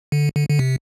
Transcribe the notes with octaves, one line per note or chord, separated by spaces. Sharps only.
D3
D3
D3
C3